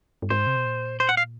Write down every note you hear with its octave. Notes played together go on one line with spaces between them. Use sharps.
G2
G#2 C5
C3
B2
A#2
C5
F#5
F5